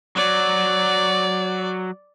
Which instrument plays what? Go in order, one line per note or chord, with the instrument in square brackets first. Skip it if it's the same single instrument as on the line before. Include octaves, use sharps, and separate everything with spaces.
[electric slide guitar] F#3 [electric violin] D5